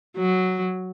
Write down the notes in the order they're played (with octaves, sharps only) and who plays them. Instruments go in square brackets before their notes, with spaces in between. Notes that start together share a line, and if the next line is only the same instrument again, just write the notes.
[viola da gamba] F#3